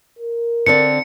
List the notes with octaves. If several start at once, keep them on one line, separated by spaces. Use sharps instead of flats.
A#4
D3 C4 D5 C#7